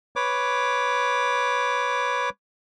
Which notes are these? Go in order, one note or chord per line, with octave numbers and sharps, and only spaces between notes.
B4 C#5 D6